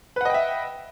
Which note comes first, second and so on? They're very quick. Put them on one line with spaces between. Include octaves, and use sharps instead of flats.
B4 F#5 D#5 G5 E5